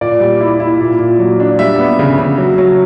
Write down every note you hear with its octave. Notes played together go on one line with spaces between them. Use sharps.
A#2 D5
G3
E4
E4
A#2
A#2
F#3
D4
G3 E5
B3
C#3
C#3
F#3
F#3